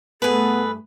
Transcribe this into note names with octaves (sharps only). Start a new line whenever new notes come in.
G2 A3 B3 G#4 A4 B4